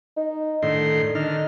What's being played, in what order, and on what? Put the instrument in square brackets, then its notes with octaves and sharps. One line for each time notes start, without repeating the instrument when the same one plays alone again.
[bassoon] D#4
[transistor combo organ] A2 D#3 C6 [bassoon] D3
[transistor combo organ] D3 D#3 F6 [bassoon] D#4